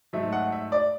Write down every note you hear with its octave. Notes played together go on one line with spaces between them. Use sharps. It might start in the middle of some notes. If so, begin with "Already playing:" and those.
G#2 F#3 A3 E5
F#5
E5
D5